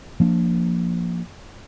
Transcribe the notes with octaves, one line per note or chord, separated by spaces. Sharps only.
F3 A#3 D4